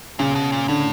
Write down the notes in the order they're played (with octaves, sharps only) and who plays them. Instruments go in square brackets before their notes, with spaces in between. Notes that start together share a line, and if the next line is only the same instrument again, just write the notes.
[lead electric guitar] A#2 [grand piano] C#3
[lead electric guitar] B2
A#2
[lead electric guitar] A2 [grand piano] D3